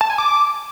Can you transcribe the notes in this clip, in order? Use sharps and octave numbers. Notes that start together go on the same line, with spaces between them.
A5
G#5
D6